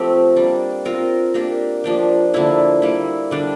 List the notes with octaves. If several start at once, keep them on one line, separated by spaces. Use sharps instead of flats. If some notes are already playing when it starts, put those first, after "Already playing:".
Already playing: F3 A3 C4 G4
G3 A#3 D4
C4 F4 A#4
A#3 D4 G4 A#4
F3 A#3 D4 G4
D3 F3 A#3 E4
G3 A#3 E4
D3 G3 D4